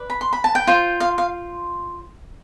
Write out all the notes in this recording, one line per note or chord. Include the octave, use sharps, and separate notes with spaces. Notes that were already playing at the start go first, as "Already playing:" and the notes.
Already playing: B4 D5
B5
C6
B5
A5
G5
F4 C5
F5
F5